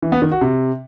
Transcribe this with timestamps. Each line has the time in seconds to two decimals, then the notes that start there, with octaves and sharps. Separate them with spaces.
0.02 E3
0.12 B3
0.22 D#3
0.32 F#4
0.41 C3